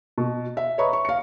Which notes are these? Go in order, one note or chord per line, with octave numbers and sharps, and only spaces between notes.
B2
E5
B4 C#5 D#5 A#5 B5 C#6
C#6
F5 C#7